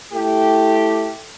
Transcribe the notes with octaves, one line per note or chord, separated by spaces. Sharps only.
A3 E4 G4